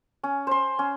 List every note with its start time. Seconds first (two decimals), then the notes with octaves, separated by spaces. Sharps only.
0.23 C#4
0.47 C5 C6
0.79 C#4